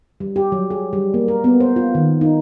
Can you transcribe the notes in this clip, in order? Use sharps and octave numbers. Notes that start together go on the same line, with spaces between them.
G3
G4
F#3
G#4
G3
A#3
A#4
B3
C5
F4
D#3
D#4